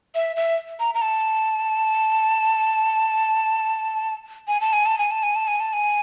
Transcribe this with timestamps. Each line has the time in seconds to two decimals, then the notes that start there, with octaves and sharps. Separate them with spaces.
0.15 E5
0.36 E5
0.80 A#5
0.95 A#5
1.02 A5
4.48 G#5
4.61 A5
4.73 G#5
4.86 A5
4.99 G#5
5.11 A5
5.23 G#5
5.36 A5
5.47 G#5
5.60 A5
5.73 G#5